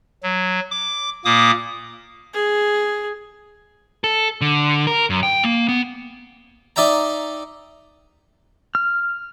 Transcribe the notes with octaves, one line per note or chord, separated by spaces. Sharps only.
F#3
D6
A#2 A#3 D6 D#6
G#4
A4
D3
A#4
F#2
G5
A#3
B3
D#4 D5 E5 G5 A#5
F6